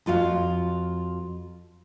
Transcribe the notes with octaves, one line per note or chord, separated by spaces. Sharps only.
F2 F4 F#4 F5